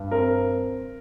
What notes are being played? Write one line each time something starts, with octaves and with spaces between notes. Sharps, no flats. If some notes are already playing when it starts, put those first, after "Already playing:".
Already playing: G2
C4 A#4